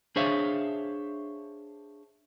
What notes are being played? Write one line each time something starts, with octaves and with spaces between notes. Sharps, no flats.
D4 G#4 C5 C#5 E5 F5